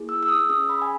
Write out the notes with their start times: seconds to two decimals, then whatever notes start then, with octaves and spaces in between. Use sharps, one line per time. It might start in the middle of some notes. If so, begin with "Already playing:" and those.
Already playing: A#3 E4 G#4
0.09 E6
0.23 E6
0.29 D#6
0.40 E6
0.49 C#4 G#4 D#6
0.69 B5
0.82 G#5